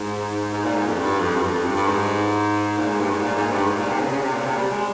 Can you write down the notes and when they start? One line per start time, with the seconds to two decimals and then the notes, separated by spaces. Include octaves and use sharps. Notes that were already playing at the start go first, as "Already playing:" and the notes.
Already playing: G#2
0.53 G#2
0.65 A#2
0.76 G#2
0.87 F2
0.98 G2
1.20 F2
1.36 G2
1.43 F2
1.55 F2
1.66 G2
1.76 G2
1.88 G#2
2.78 A#2
2.89 G#2
3.00 G2
3.11 G#2
3.23 A#2
3.36 G#2
3.52 G2
3.66 G#2
3.78 A#2
3.89 C3
4.00 C#3
4.12 C#3
4.22 C3
4.34 A#2
4.45 C3
4.56 G3
4.71 G#3